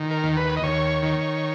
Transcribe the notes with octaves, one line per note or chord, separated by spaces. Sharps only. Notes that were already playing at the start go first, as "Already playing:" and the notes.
Already playing: D#3
A#4
D#2
B4
D#5
D#2 C#5
D#3